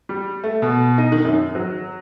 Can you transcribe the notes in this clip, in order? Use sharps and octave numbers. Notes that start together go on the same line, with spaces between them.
G3
A3
B2
D#4
D#3
F#2
F#3